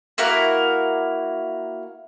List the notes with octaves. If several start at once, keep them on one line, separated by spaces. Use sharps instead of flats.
A#3 E4 F#4 A#4